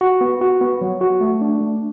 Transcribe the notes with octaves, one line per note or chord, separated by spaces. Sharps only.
F#4
B3
F#4
B3
F#3
F#4
A3
D4
A3